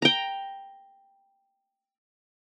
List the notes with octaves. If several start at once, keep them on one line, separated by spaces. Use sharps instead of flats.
G5 A#5